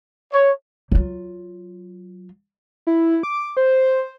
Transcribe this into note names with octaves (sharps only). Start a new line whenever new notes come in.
C#5
F#3 F4
E4
D6
C5